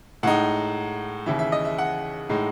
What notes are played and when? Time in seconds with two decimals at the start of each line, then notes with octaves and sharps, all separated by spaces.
0.23 A2 G#3 D#4 F#5
1.26 D#2 C#3 E3 E5
1.39 E5
1.52 D#5
1.65 E5
1.78 F#5
2.29 A2 G#3 D#4